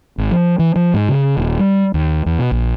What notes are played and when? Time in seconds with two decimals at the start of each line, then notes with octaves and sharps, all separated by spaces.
0.18 G#1
0.31 F3
0.59 E3
0.76 F3
0.94 G#2
1.09 C#3
1.37 D#1
1.59 G3
1.94 D#2
2.26 E2
2.39 B2
2.52 A#1